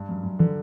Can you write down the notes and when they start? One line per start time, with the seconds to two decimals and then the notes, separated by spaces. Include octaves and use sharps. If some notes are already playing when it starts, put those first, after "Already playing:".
Already playing: G2
0.09 F#2
0.24 F#2
0.39 D3 E3